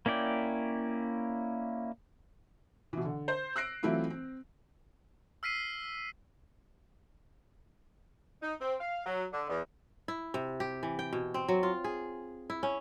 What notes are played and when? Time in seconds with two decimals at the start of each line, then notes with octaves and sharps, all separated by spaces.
0.06 A#3 C#4 E4 D5 G5
2.93 B2 E3
3.05 D3
3.28 C5
3.56 E6 F#6 A#6 C7 D7
3.83 E3 F#3 A3 C4 E4 F4
4.10 C4
5.43 E6 F6 B6 C7 D#7
8.42 D#4
8.60 C4
8.80 F5
9.06 F#3
9.33 D3
9.49 E2
10.08 E4
10.34 C3
10.60 G4
10.83 E3
10.99 G5
11.13 B2
11.34 C4
11.48 F#3
11.63 F4
11.84 G#4
12.50 E4
12.63 C#4